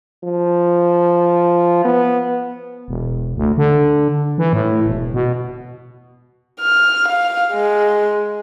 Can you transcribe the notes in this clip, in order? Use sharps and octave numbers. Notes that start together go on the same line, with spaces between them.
F3
B3
E1
D2
D3
E3
A2
E1
B2
F6
F5
G#3